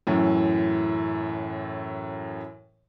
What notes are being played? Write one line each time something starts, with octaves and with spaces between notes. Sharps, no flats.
F#2 A2 E3